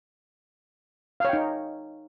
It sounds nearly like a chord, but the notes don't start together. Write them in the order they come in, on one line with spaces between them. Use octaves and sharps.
F5 C#5 G5 D#4